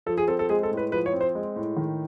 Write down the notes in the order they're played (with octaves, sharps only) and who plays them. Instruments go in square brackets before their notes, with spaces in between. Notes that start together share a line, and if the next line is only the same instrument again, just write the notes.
[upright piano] F3 A4
G#4
C4 A4
A4
G#3 G#4
A4
A2
B4
F3 B4
C#5
C4
C5
G#3
A2
D#3